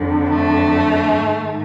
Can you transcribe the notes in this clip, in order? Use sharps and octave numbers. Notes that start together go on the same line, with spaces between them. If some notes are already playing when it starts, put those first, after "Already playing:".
Already playing: F2 D3
A3
G#2 D#3